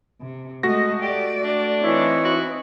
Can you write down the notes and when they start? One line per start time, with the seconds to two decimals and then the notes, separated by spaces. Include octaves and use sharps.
0.21 C3
0.63 G#3 A3 F#4 D#5 A#6
1.02 G4 D5
1.44 D4
1.83 E3 C4 D#4 E4 C#5
2.25 F#4